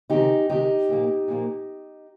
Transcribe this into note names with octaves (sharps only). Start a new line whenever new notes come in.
C3 D#3 G#3 D#4 G4
C3 D#3 G#3 D#4 G4
A#2 F3 A#3
A#2 F3 A#3